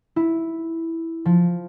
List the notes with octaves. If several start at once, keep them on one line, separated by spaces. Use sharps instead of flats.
E4
F3